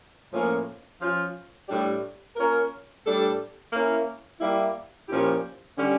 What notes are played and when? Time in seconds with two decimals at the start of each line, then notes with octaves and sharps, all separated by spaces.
0.31 A2 F3 A#3 C#4
0.99 F3 C#4 F4
1.68 A2 G3 D4 G4 D5
2.36 A#3 C#4 F4 A#4
3.04 A2 G3 D4 A4 D5
3.72 A#3 C#4 E4
4.40 G3 A#3 E4
5.08 A#2 F3 C#4 E4 G4
5.77 D3 G3 C#4